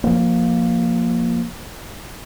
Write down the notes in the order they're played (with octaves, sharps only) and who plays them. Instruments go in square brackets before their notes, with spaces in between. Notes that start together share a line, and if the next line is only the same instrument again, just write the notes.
[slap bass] F3 A#3